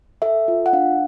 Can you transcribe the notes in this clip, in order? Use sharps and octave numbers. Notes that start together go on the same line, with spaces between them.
A4 E5
F4
F#5
D4 F5